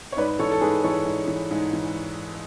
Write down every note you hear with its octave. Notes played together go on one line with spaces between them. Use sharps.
C#5
G#2 B4 D5
E3 A4 C#5
A4
G#2 G#4 B4
E3 A4 C#5
G#2
E3
G#2
E3